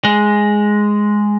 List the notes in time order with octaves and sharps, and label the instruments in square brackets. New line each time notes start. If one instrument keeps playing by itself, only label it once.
[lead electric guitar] G#3